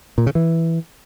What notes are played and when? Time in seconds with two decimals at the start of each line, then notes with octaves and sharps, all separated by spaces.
0.18 A#2
0.26 C#3
0.35 E3